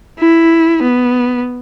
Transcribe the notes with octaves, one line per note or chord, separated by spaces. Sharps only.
E4
B3